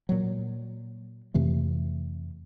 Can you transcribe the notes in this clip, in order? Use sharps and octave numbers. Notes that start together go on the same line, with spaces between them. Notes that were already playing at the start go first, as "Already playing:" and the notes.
A#2 F#3
F2 C3 E3 A3